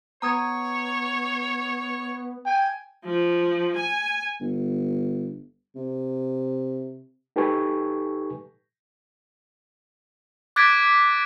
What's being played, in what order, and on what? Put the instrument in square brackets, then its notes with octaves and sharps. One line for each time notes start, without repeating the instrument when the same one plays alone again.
[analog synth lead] B3 [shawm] C#5 [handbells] A#5 D#6 G#6
[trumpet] G5 [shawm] G#5
[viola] F3
G#5
[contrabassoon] G1
C3
[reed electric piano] D#4 G4 A4 B4 G#5 C#6
[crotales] D6 F#6 G#6 A6 B6 D7